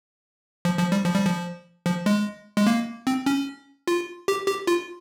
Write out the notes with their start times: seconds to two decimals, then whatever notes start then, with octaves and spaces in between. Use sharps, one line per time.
0.65 F3
0.79 F3
0.92 G3
1.05 F3
1.15 G3
1.26 F3
1.86 F3
2.06 G#3
2.57 G#3
2.67 A#3
3.07 C4
3.26 C#4
3.87 F4
4.28 G4
4.47 G4
4.67 F4